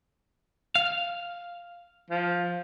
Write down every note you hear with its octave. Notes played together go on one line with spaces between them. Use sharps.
F5
F3